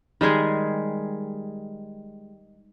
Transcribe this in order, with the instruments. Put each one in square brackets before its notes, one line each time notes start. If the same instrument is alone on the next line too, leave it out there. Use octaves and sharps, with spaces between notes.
[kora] D#3 G3 G#3 G#4